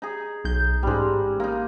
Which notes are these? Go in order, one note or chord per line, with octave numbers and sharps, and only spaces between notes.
D#4 G#4
B1 G6
A1 G#2 G3 G#3
A#3 D#4